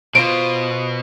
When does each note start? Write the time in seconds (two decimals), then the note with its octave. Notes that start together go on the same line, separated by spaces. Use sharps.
0.15 B2 F4 C5 D#6 D7